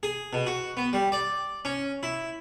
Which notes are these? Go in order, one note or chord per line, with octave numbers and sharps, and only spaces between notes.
G#4
B2
F#4
B3
G3
D5
C#4
E4